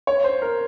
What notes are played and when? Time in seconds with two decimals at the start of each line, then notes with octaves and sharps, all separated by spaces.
0.07 C#5
0.24 C5
0.42 A#4